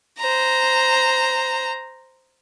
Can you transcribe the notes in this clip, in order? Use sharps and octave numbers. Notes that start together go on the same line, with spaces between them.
C5 A#5